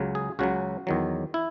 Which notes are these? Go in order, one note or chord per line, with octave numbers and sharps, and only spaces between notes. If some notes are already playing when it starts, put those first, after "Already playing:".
Already playing: C#2 C#3 F#3
G#4
C#2 C#3 F#3 F#4
E2 D#3 F#3
E4